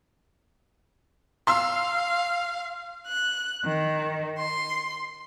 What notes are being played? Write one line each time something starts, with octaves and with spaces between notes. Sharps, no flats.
F5 C6 E6
F#6
D#3
C6